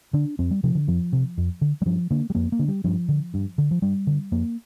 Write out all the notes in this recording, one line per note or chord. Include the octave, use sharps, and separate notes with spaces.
D3 D4
F2 C4
G3
C3 F3
D3
F2 F3
C3
F2
D3
G3
G2 F3
D3 A#3
G3
F2 A#3
A#3
D3
G3
G2 F3
D3
G2
D3
F3
G2 G3
D3
F2 A#3